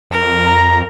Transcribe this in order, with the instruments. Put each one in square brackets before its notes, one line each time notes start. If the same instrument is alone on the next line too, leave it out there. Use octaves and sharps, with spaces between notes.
[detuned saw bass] F2 [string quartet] A#4
[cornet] A#5